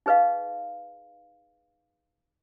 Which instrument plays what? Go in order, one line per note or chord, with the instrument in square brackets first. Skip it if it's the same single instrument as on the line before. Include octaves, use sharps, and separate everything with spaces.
[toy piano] D#4 G#4 B4 D#5 F5